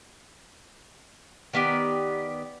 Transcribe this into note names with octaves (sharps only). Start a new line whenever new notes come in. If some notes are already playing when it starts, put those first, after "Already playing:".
D#3 B3 G4 D5